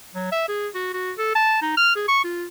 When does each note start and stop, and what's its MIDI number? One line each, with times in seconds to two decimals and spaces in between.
0.14 0.27 54
0.32 0.44 76
0.48 0.68 68
0.75 0.89 66
0.94 1.12 66
1.18 1.30 69
1.35 1.61 81
1.62 1.76 63
1.77 1.92 89
1.96 2.06 68
2.08 2.22 85
2.24 2.46 65